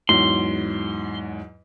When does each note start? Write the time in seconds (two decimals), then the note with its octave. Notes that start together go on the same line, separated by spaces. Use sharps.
0.09 E2 G#2 F#3 C6